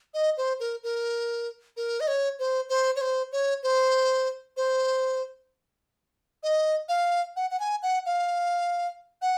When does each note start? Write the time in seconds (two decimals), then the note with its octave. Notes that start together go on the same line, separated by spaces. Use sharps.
0.14 D#5
0.37 C5
0.60 A#4
0.83 A#4
1.77 A#4
2.00 D#5
2.07 C#5
2.39 C5
2.69 C5
2.96 C#5
3.01 C5
3.32 C#5
3.63 C5
4.57 C5
6.43 D#5
6.89 F5
7.36 F#5
7.50 F#5
7.59 G#5
7.82 F#5
8.06 F5
9.22 F#5